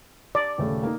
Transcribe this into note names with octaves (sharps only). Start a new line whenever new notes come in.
D5
D#1 C#3 A3
A#3 D#4